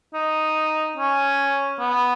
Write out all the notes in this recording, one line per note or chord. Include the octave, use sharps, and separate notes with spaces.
D#4
C#4
B3